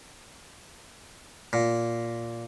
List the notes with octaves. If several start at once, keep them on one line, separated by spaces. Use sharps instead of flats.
A#2